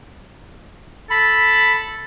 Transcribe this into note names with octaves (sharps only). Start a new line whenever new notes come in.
A4 B5